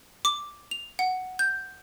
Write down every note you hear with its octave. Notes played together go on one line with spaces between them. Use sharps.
D6
F7
F#5
G6